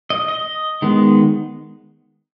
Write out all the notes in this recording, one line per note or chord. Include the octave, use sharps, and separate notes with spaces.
D#5
D#5
D#3 G#3 B3